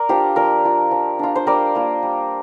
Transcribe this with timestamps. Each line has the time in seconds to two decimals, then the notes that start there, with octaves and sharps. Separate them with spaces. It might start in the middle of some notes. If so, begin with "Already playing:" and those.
Already playing: A#4 D5
0.09 D4 F4 G4 C5
0.36 F3 A#4 D5
0.64 D4 F4
0.91 F3
1.19 D4 F4
1.36 C5
1.47 G3 A#4 D5
1.75 A#3 F4
2.03 G3